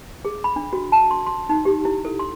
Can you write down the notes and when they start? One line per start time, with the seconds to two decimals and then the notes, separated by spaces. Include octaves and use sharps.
0.25 G#4
0.44 B5
0.56 D4
0.73 F#4
0.92 A5
1.11 C6
1.27 C6
1.49 D#4
1.65 G4
1.85 E4
2.05 A4
2.19 C6